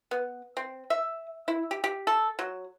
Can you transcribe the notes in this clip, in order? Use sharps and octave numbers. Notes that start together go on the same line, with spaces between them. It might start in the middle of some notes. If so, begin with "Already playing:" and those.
B3
C4
E5
E4
G4
G4
A4
F#3